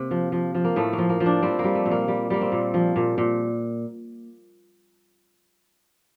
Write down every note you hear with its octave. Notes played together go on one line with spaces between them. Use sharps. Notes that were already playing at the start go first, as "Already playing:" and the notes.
Already playing: C3 A#3
F3
F3
F3
A#3
A2 A3
A#3
F3
A#3
F3
D4
G3 C4
G3 A#3
A3
A#2
A#3
G3
G3 A#3
C4
A#2
F3
A#2
A#2